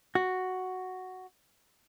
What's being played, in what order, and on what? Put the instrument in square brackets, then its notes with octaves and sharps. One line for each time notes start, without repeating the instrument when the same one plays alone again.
[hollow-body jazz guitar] F#4